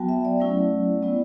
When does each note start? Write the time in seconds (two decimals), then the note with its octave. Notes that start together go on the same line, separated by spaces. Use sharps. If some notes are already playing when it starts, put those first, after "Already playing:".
Already playing: F#3 B3 F#4 G5 A5
0.09 E5
0.25 D5
0.40 F#3 A3 C#4 E4
1.02 G3 B3 E4 D5